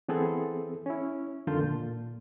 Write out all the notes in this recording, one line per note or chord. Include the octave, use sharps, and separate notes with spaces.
E3 B3 C4 G#4 A4
C#4 E4
F2 D3 D#3 F4 A5 G6
A#2